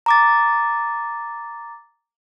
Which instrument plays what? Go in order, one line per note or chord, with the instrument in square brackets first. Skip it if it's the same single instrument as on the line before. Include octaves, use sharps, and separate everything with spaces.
[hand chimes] A#5 D6 A6